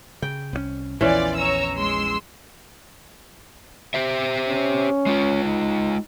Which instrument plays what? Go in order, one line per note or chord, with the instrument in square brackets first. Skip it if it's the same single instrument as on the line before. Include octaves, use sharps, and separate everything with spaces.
[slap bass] C#3 [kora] G5
[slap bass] C2 E3 C#4
[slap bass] A#1 E2 [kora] E3 C#4 [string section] F4 D5
[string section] C#5 A#5 E6
G#3 C6 E6
[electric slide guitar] G4 C5 E5
[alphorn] C#4
[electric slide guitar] G#3 F4
[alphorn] D#4